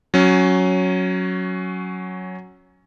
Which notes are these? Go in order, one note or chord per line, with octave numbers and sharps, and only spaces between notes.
F#3 C#4